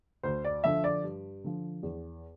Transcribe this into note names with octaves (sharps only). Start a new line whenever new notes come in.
D2 C5
D5
D3 F3 E5
D5
G2
D3 F3
E2